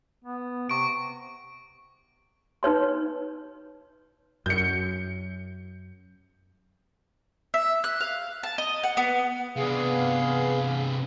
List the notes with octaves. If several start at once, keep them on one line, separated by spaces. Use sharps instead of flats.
B3
C3 C#6 D7
D#4 B4 C#5 C6
F#2 G6 C#7
E5
F#6
F5
A5
D#5
F#5
B3
C3 B3 D4 G#4 F5